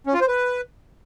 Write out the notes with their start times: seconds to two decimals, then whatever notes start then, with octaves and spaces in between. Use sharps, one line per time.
0.07 C#4
0.14 F4
0.21 C5
0.28 B4